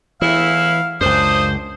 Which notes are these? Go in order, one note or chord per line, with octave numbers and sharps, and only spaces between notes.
E2 A2 E3 E4 F5
C#2 F#2 D4 C5 D#6